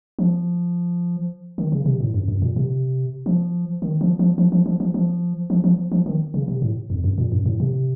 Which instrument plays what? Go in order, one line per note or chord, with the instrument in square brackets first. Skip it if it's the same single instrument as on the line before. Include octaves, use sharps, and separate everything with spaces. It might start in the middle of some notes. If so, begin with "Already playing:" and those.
[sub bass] F3
D#3
C#3
C3
A2
F#2
F#2
A#2
C3
F3
D#3
F3
F3
F3
F3
F3
F3
F3
F3
F3
F3
D#3
C#3
C3
A2
F2
F#2
A#2
F#2
A2
C3